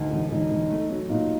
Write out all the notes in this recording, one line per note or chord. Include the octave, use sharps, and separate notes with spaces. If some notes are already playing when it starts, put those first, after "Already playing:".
Already playing: D2 D#4
E1
E1 D#4
E1
A3
F#3
A#2 D#4